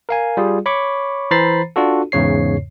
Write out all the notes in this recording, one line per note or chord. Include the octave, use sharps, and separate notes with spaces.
A#4 F5 G#5
G3 F4 G#4
C#5 B5 C#6 D6
E3 C5 A#5 B5 A6 C7
D4 F4 F#4 A4
E2 G#2 C#3 C#5 C7